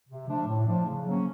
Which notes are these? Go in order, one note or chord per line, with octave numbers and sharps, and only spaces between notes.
C3
F3 A3 D4
A2
F3 A3 D4
C#3
F#3 A#3 C#4